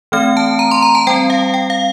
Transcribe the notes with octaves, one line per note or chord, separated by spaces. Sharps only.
E3 A3 C4 F6
A5
A#5
C6
A#5
A5
G3 C4 G5
F5
G5
F5